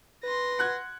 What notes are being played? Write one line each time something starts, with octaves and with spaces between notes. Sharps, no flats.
B4 C6 A#6
F#5 F#6 G#6